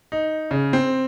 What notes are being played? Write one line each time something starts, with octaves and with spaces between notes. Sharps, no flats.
D#4
C#3
C4